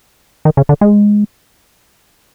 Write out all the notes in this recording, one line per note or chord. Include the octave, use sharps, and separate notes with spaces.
D#3
C#3
D3
G#3